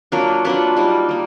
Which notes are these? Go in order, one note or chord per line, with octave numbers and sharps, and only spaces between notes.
F#3 A#3 D4 F4 A#4
F#3 A#3 D4 F4 B4
G3 A#3 D#4
G3 A#3